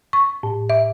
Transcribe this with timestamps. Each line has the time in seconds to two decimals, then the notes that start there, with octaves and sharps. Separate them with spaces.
0.13 C#6
0.43 A2
0.70 E5